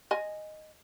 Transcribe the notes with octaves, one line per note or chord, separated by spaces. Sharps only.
D#5 G#5